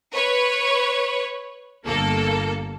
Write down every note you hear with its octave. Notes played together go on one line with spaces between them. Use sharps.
B4 C#5
G1 A#3 A4